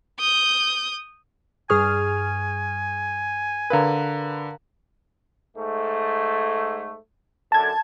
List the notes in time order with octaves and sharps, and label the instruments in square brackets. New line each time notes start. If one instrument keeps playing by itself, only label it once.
[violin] D#6 G6
[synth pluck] G2 G#4 F6 [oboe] G#5 [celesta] C#6 D#6
[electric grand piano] D3 B4 [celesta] A#4 F5 A#5
[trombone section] G#2 A3
[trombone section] F#2 D3 A4 [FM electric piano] A5 G#6